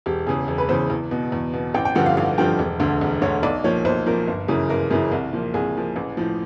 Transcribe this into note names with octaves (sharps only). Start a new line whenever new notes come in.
E1 G4
E2 C#3 G#4
E1
B4
E2 C#3 C5
E2
B2
E2
B2
A1 G5
G5
G2 D3 F3 F#5
F5
A1 F5
G2 D3 F3 G5
E1
D2 D3
E1
D2 D3 C#5
B1 D5
A#2 F3 C#5
B1 C5
A#2 F3 A#4
G1
F#2 C#3 E3
G1 A#4
F#2 C#3 E3
C2
A#2 F3
C2 G#4
A#2 F3
A1
A2 F3